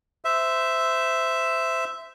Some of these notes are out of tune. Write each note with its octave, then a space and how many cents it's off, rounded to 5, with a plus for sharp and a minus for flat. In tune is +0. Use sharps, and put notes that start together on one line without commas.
C5 -20 E5 +0